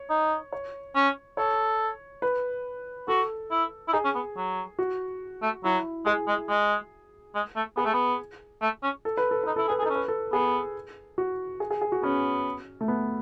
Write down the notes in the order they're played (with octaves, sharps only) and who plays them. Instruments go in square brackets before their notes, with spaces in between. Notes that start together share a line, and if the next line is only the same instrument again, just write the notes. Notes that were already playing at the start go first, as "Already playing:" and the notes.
Already playing: [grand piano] C#5
[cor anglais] D#4
[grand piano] C#5
[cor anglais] C#4
[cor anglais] A4 [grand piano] C#5
[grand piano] B4
[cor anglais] F#4 [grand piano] A4
[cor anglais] E4
E4
[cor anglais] D#4 [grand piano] G#4
[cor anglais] C#4
B3
F#3
[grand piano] F#4
[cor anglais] A3
[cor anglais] F#3 [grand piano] E4
[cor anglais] G#3 [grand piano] G#4
[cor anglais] G#3
G#3
G#3
A3
[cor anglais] B3 [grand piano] G#4
[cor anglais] A3
B3
A3
C#4
[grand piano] A4
B4
A4
[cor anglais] D#4 [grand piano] B4
[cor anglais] E4 [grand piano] A4
[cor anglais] G#4 [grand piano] B4
[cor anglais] G#4
[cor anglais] D#4 [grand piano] A4
[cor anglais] C#4
[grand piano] B4
A4
[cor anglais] B3 [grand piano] G#4
[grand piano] F#4
G#4
G#4
G#4
F#4
[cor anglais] B3 [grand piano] C#4
[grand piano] A3
B3